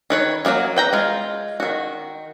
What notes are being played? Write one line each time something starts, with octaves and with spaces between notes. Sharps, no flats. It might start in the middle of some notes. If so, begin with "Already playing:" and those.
D#3 B4 C#5
F#3 A3 A#3 F#4
B4 G5 A#5
G#3 F4
D#3 F#4